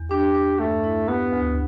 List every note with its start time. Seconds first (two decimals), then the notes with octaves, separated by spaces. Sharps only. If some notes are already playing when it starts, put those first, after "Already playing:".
Already playing: E2
0.11 D4 G4
0.35 D4
0.59 G2 A3
0.84 E4
1.08 B3 G4
1.33 D2